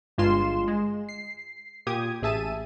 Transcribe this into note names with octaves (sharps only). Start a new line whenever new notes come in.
G1 G2 G#3 F4 C6 E7
G#3
C7
A#2 G4 D#6 G#6
A1 G#4 E5 A5 D#7